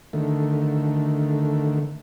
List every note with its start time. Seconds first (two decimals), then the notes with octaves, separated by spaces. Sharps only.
0.13 D3 D#3 A3